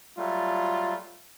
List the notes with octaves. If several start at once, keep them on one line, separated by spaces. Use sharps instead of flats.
F#3 G3 A3 F4